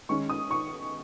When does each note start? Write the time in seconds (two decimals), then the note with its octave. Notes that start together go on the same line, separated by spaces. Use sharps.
0.09 D#3 G#3 C#4 C#6
0.30 D#6
0.51 C#6